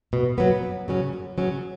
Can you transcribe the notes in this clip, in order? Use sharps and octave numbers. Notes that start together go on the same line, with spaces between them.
B2
F#3 B3
F#2
C#3 F#3 C#4
F#2
C#3 F#3 C#4